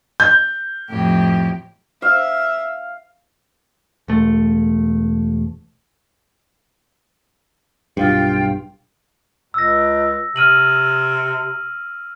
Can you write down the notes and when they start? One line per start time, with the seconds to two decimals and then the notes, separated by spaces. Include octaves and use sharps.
0.20 G6
0.89 F2 A2 G4
2.02 E5 F5
4.08 E1 A3
7.97 B1 G2 F4 G5
9.54 C#2 E6 A#6
10.36 C3 F6 D#7 F#7